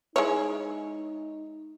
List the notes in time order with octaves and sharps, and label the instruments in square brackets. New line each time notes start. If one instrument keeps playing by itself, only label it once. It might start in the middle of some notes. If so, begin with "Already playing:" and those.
[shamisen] G#3 E4 C#5 [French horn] D#4